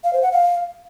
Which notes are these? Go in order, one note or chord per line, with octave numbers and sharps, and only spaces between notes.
F5
C5
F#5
F5